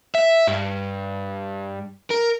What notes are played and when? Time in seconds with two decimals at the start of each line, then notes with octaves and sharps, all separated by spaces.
0.15 E5
0.48 G2
2.10 A#4